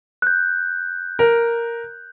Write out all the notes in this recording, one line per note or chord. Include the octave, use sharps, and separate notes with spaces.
F#6 G6
A#4